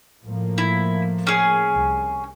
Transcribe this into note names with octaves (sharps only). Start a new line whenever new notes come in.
A2 F3 A#3
E4
C#4 G#4
C2